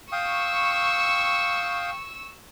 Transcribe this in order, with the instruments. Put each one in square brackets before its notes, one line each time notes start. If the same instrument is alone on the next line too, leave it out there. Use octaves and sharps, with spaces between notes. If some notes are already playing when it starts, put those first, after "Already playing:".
[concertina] F5 G5 D#6 [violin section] C#6 E6